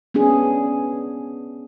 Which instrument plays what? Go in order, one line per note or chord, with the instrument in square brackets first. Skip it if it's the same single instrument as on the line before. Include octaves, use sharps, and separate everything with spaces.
[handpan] B3 C#4 D4 G#4